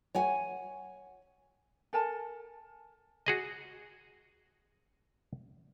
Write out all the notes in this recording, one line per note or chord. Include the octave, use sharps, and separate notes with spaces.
C#5 F#5 G#5
A4 A#4 G#5 A5
F#4 G#4 D#5